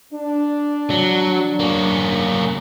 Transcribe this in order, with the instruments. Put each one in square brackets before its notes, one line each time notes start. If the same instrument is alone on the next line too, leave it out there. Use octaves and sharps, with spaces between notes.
[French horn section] D4
[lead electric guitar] F#3
A#3 C#4